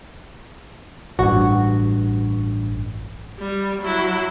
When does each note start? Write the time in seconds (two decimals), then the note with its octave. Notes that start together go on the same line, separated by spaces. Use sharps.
1.19 A1 G2 F#4
3.39 G3
3.82 F#3 E4